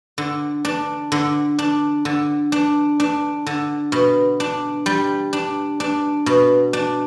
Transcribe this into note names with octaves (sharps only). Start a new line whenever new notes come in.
D3
D4
D3
D4
D3
D4
D4
D3
B2
D4
G3
D4
D4
B2
D4